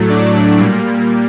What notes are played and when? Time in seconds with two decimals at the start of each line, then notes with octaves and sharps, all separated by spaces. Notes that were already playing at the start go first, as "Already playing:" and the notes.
Already playing: A2 F#3 A3
0.09 D4 D5
0.59 A#2 G3 A#3